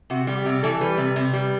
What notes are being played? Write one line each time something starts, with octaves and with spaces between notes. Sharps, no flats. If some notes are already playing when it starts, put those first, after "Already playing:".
C3 F#4
G3 G4
C3 G4
E3 A4
G3 B4
C3
C3
G3